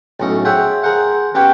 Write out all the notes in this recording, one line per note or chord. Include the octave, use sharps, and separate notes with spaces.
B1 A2 C#4 D#5
G#4 C5 C#5 E5 F#5 G5
G#4 A#4 C5 F#5
B3 C#4 G4 B4 C#5 G5